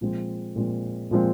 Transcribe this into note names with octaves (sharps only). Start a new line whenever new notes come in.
A#2 F3 G#3 C4
A#2 F3 G#3 C4
A#2 F3 G#3 C4